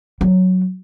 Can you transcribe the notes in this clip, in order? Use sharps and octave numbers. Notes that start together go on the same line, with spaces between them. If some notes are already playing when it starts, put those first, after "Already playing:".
F#3